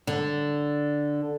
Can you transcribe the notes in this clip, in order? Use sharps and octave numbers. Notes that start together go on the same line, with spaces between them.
D3